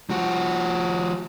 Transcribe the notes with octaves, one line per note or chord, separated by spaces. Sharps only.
F3 F#4